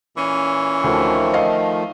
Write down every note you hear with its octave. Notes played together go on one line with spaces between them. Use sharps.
A#2 E3 C#4
D2 D#3 F3 A3
D#5 F5